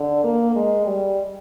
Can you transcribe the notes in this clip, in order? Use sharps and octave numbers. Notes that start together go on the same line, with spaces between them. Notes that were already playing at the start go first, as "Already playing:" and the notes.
Already playing: D3
A#3
G#3
G3